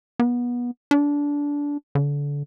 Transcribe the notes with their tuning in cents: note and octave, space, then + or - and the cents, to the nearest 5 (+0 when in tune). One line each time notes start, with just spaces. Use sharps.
B3 -25
D4 -20
D3 -30